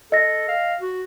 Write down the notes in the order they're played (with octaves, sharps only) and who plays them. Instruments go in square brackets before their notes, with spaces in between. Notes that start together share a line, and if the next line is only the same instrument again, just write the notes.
[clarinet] A4 [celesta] D#5 A#6
[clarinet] F5
F#4